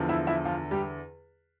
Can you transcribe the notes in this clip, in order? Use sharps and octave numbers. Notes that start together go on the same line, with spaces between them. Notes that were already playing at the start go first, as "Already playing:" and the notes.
Already playing: E2 D3 F3
E4 E5
E4 E5
F3 F4
G3 G4